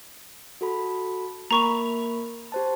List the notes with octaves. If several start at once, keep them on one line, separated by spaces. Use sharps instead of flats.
F#4 A4 B5
A#3 A#4 A#5 B5 C#6 F7
G4 C5 A5